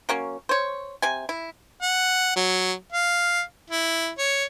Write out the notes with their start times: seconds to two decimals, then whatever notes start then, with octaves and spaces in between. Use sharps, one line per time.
0.09 F#3 A#3 C#4
0.49 C5 C#5
1.02 C3 G#5
1.29 E4
1.82 F#5
2.36 F#3
2.93 F5
3.71 E4
4.18 C#5